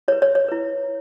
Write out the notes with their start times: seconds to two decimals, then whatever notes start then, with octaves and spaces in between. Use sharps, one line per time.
0.08 E4 B4 C#5
0.22 C#5
0.35 C#5
0.48 E4 B4